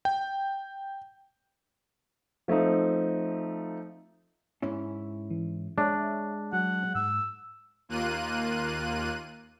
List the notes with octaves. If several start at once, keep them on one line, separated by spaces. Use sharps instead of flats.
G5
F3 A3 C4 D#4
G#2 C#4 E4
E3
G#3 D4 C#5 E5
F#3 F#5
G#2 E6
D#2 A#3 F4 F#6 D#7